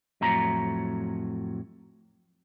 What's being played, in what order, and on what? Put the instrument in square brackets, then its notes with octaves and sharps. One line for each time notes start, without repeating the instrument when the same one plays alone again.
[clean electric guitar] F2 A2 F#3 A#5